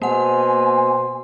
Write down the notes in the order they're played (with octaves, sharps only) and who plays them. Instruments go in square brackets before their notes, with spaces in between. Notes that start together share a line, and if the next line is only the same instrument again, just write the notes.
[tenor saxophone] B2 [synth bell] A#3 F#5 [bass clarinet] C5 [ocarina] G#5